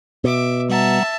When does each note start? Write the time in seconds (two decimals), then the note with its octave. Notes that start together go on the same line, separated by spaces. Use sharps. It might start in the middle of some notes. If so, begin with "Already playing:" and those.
0.24 B2 E5 D6
0.70 G3 E5 F#5 A5 A#5